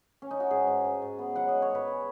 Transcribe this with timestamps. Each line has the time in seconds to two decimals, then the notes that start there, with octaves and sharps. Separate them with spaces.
0.22 C#4
0.31 D#4
0.40 F#4
0.50 G#2 G#4
0.67 G#2
0.85 G#2
1.02 G#2
1.19 B3
1.36 F#3 F#5
1.49 G#2 D#5
1.62 C#5
1.70 G#2 B4
1.88 G#4